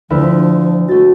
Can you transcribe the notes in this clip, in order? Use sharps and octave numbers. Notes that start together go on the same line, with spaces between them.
D2 F3 E4 B4
A3 F#4 A6